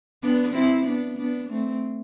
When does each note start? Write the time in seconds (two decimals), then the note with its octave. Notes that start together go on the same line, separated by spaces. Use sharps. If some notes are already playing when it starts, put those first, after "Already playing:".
0.23 B3 D4
0.53 C4 E4
0.85 B3 D4
1.18 B3 D4
1.50 A3 C4